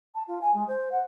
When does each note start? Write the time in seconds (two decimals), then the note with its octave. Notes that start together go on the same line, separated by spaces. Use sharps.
0.14 A5
0.27 F4
0.41 G#5
0.53 G#3
0.67 C5
0.91 F#5